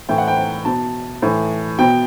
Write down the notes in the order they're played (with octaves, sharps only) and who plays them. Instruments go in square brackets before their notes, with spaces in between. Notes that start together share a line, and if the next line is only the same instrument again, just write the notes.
[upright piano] A2 E3 G5
F#5
G5
B2 A5
A2 E3
B2 G5